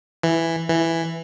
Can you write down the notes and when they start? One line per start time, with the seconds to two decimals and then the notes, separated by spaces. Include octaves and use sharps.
0.23 E3
0.70 E3